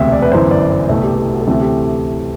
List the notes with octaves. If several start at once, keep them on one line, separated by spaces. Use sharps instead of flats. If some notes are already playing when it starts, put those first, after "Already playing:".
Already playing: E1 D2 C3 E5
D5
B4
G1 F#2 E3 C5
D5
C5
C2 B2 A3 B4
G4
G4
F#4
A4
D2 C3 E3 A3 C4 G4
G4